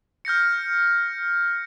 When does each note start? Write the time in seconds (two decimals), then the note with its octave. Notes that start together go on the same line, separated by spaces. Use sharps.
0.25 F6 G6 A#6 C#7